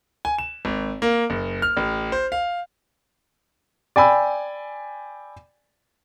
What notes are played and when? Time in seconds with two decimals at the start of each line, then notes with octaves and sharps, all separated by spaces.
0.25 G#5
0.38 E7
0.65 G#1
1.02 A#3
1.30 F#1
1.62 F6
1.77 A1
2.12 C5
2.32 F5
3.96 D5 G5 G#5 B5 E6